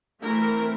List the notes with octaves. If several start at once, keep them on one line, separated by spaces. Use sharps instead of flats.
E3 A3 C4 E4 A#4